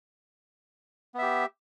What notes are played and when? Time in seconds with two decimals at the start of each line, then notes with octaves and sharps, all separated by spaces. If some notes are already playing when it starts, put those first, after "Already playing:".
1.14 B3
1.18 E5
1.22 G4